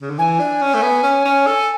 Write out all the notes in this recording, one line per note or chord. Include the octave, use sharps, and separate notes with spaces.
C#3
D3
E3 G#5
D4
C#4
A3
B3
C#4
C#4
A4